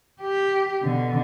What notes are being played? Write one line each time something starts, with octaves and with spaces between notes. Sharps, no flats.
G4
B2 D3